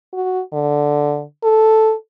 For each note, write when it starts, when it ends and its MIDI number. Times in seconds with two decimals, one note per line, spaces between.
0.13 0.41 66
0.53 1.23 50
1.43 1.93 69